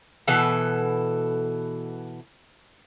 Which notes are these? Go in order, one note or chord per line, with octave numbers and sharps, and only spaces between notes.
B2 E3 A4